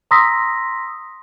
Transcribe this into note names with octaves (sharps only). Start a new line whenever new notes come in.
A#5 C6 D#6 E6 A#6 B6